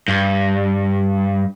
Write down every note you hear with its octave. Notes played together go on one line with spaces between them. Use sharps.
G2